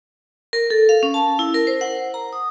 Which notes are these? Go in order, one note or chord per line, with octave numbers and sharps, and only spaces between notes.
A#4
A4
F5
C#4
A5
E4
A#4
C5
F#5
A#5
D#6